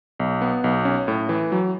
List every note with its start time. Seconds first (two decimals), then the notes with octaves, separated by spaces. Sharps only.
0.20 B1
0.41 B3
0.64 B1
0.85 C#4
1.08 A2
1.29 E3
1.52 F#3